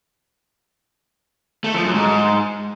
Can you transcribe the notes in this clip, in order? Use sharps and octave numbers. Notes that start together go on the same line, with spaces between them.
A3
F3
F#2
G#2